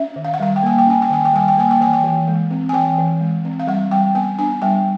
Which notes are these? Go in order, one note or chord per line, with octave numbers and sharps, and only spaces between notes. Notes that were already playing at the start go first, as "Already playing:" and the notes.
Already playing: C#4 E5
D#3
F5
F#5
G3 F5
G5
A#3 G#5
G5
C#4 G#5
G5
D#3 G#5
G5
G3 G#5
G5
A#3 G#5
G5
E3 G#5
G5
E3
G#3
C4
G#5
E3 G5
E3
G#3
C4
F5
G3 F#5
G3 G5
B3 G#5
D4 G#5
G3 G5